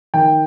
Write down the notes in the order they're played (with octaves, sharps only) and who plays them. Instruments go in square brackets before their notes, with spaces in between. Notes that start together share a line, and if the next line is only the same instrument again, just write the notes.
[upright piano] D#3 G5